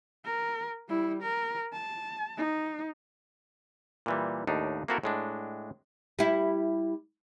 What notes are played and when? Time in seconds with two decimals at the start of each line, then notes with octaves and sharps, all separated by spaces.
0.25 A#4
0.89 G3 E4
1.22 A#4
1.73 A5
2.37 D#4
4.06 A#2 E3 G3
4.47 D#2 A2 D4 D#4
4.88 A#3 C4 E4 F#4 A4 A#4
5.03 A2 G#3 D4
6.19 G3 E4